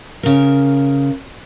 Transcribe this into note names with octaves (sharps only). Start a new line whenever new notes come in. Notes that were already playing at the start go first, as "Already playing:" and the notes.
C#3 A#4